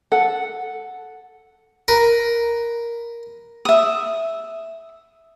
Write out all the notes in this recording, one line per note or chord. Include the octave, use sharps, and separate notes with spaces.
A4 F#5
A#4 B4
E5 D#6